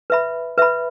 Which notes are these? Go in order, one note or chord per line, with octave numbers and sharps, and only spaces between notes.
B4 E5 B5
B4 E5 B5